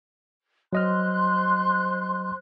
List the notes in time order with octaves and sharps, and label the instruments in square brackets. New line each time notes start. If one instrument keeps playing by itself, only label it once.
[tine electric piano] F#3 D#5 F6 [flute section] C5 C6 F#6